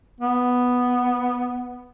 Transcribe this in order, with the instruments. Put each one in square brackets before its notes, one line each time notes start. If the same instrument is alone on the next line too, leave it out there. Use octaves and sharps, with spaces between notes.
[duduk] B3